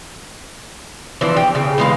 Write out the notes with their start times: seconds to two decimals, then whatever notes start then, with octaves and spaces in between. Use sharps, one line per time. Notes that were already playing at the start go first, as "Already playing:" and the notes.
1.21 E3 F3 D4
1.36 G4
1.55 C#3
1.78 E3 G#3 F5